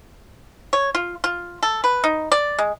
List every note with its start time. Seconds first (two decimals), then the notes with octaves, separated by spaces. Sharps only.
0.73 C#5
0.95 F4
1.24 F4
1.63 A4
1.84 B4
2.04 D#4
2.32 D5
2.59 G#3